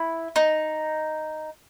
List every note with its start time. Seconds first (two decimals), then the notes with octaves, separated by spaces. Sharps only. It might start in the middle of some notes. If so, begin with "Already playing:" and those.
Already playing: E4
0.36 D#4